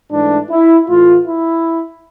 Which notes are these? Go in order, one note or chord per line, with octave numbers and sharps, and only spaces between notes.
G#2 E3 A3 D4
E4
A2 E3 A3 F4
E4